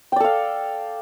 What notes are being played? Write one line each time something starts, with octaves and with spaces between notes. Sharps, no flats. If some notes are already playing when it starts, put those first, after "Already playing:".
A4 D5 F5 G5